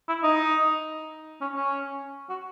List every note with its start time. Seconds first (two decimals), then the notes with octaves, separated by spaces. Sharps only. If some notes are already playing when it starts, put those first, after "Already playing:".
0.08 E4
0.23 D#4
1.41 C#4
1.56 C#4
2.30 F#4